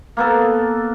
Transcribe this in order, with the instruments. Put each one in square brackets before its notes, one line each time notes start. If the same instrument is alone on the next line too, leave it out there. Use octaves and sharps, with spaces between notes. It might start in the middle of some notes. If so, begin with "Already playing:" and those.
[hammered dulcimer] A#3 B3 A4